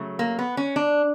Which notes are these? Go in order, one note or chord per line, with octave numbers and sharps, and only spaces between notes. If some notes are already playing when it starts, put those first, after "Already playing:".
Already playing: C#3 F#3 A3
A#3
B3
C#4
D4